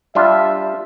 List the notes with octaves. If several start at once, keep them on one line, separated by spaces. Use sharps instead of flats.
G3 D4 F4 E5